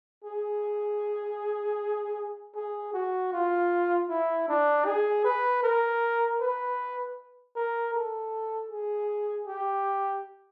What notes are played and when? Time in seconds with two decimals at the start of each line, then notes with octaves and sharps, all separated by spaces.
0.24 G#4
2.56 G#4
2.94 F#4
3.33 F4
4.09 E4
4.48 D4
4.86 G#4
5.24 B4
5.63 A#4
6.41 B4
7.56 A#4
7.94 A4
8.71 G#4
9.48 G4